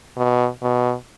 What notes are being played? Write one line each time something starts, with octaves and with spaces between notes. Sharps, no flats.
B2
B2